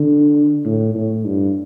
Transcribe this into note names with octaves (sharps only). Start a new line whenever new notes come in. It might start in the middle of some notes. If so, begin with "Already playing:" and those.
Already playing: D3
A2
A2
G2